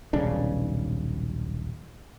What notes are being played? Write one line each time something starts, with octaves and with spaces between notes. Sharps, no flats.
D#1 B1 C#3 D4